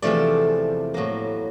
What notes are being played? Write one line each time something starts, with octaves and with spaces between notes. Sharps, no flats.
E2 C3 F3 A3 D5
A2 F#3 A#3